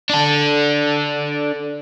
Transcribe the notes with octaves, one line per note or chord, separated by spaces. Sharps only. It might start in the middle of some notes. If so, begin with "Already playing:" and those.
D4 A4